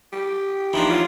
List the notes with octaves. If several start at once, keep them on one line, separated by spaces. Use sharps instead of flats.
G4
E3 F3 A#3 D4 D#4
F4 C#5 F5